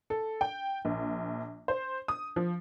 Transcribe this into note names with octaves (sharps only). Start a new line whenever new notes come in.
A4
G5
A#1
C5
D#6
F3